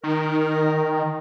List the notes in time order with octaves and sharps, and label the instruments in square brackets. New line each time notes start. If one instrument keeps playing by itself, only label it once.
[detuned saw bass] D#3 [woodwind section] A#4